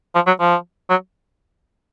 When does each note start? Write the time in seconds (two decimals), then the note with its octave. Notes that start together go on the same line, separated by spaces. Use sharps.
0.15 F3
0.27 F#3
0.40 F3
0.90 F#3